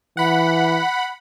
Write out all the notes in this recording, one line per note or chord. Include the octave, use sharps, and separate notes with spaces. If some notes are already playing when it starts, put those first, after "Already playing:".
E3 F#5 B5